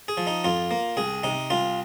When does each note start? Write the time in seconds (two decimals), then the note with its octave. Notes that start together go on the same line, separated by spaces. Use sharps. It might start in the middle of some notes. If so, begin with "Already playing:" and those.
0.08 G#4
0.17 F3
0.27 D#4
0.44 F2 F4
0.71 A#3
0.97 C2 G#4
1.23 C3 D#4
1.50 C2 F4